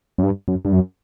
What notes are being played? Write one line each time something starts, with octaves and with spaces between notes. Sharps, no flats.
F#2
G2
F#2
G2
F#2